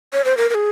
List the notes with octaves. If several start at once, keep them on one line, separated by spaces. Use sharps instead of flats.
C#5
C5
A#4
A#4
G#4